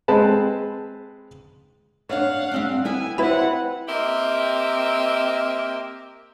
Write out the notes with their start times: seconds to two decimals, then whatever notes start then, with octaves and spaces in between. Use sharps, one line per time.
0.08 G#3 C4 B4 A5 B5
2.09 D4 C#5 F5 F#5
2.52 G3 C4 D4
2.85 B3 E4 G5 G#5
3.18 C4 E4 B4 C#5 F#5
3.88 A#3 C4 G4 A#4 D#5 E5